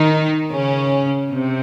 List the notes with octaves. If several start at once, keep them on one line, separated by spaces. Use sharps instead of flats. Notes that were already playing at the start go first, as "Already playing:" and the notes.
Already playing: D#3 D#4
C#3 C#4
C3 C4